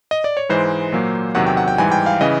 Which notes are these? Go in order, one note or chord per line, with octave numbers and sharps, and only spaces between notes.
D#5
D5
C#5
G#2 E3 G#3 C5
A#2 F#3 A#3
E2 C3 D#3 F#3 F#5
G5
F#5
G5
G#2 E3 G3 G#5
G5
F5
C#3 E3 D#5